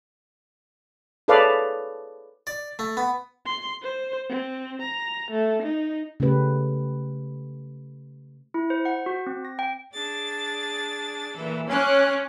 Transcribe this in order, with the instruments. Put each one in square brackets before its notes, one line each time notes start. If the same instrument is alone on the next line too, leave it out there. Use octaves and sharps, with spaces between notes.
[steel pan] G#4 A4 B4 C#5 D5 F5
[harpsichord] D5
A3
B3
[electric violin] C6
C5
C4
A#5
A3
D#4
[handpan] C#3 A3 C#4 G4 B4
[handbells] E4
C5
F#5
F#4
C4
A#6
G5
[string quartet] D4 G#4 A6
A#2 E3 A4
[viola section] C#4 [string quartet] C6 D6 F#6